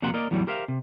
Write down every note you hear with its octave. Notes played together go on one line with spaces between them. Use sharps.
F2 C3 A#3 F#4 F#5 C6
A#3 A#4 D5 D#5
E2 A2 E3 F#3 G3 B3
G4 A#4 C5 E5 F5
C3